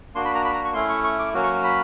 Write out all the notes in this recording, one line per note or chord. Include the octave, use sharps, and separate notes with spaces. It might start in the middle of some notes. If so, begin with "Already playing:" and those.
A#3 D4 F#4 C6
B5
A#5
B5
A#5
C#6
A3 C#4 E4 C6
C#6
C#6
D6
F#3 A#3 C#4 F#4
C#6
B5